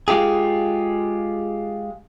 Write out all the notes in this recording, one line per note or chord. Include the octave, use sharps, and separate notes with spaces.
G#3 F4 G4 G#4